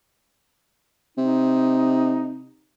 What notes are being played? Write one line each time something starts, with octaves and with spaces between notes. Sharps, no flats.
C3 D#4